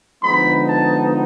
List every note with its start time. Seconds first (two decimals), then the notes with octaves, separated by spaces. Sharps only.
0.23 D3 F3 G#3 B3 D#4 B5
0.67 A5